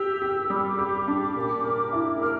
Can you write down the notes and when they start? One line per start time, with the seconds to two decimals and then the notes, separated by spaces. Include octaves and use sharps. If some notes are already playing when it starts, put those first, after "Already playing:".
Already playing: G4 E6
0.22 G4
0.50 G3 D6
0.79 G4
1.08 D4
1.36 A#2
1.64 A#4
1.93 E4
2.22 A#4 F6